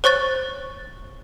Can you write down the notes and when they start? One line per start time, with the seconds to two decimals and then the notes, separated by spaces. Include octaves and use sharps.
0.04 C5 C#5 C#6 F#6 A6